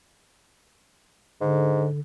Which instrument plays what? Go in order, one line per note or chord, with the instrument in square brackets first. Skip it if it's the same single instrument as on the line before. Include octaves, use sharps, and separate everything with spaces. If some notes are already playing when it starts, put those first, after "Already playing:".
[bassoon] G#2 [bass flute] D3